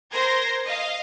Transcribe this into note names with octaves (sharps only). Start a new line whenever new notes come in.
A#4 C5 C6 G#6 A#6
D#5 F5